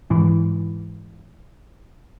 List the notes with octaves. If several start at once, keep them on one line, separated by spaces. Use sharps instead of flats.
G#2 E3